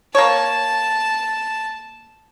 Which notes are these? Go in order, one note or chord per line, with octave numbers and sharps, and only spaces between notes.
A#3 C#5 A5